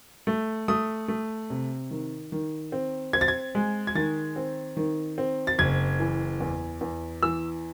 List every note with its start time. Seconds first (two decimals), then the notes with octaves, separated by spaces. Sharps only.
0.27 A3
0.68 A3 D#6
1.08 A3
1.50 C3
1.91 D#3
2.32 D#3
2.72 C4
3.13 C4 G#6
3.21 A6
3.28 G#6
3.55 G#3
3.87 G#6
3.95 D#3 A6
4.36 C4
4.77 D#3
5.18 C4
5.47 A6
5.58 F#1 G#6
6.00 E3
6.40 E2
6.81 E2
7.23 E3 E6